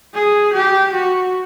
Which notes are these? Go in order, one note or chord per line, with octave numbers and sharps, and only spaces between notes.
G#4
G4
F#4